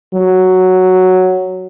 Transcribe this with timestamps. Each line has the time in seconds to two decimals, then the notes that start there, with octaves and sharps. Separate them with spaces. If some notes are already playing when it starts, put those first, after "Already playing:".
0.14 F#3